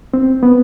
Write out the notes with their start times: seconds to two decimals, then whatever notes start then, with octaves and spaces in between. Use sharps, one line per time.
0.14 C4
0.43 B3